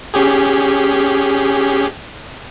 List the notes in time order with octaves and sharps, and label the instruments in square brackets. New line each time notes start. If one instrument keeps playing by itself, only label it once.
[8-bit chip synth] C#4 G4 G#4